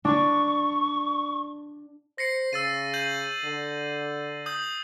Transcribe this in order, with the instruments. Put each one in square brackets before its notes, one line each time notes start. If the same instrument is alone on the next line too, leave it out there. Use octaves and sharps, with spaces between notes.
[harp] D4 [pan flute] C#6
[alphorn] C5 [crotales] A#6 C7 C#7
[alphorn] C#3 [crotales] E6 A6 D#7
[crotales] G6 D#7 F#7
[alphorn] D3
[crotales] D#6 G6 F#7